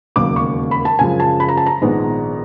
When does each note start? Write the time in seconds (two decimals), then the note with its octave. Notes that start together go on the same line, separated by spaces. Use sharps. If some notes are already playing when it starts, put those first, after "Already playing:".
0.16 E1 D#2 C#3 F#3 A#3 D6
0.36 C#6
0.71 B5
0.85 A5
0.98 F#2 C#3 F3 G#3 G#5
1.20 A5
1.40 B5
1.48 A#5
1.57 A5
1.66 A#5
1.82 A#1 G#2 D#3 G#3 B3